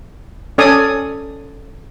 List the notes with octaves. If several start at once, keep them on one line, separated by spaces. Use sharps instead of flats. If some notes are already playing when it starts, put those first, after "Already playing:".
C#4 A4 D5 G#5 D#6